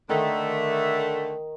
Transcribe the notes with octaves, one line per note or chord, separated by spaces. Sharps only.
D3 D#3 A3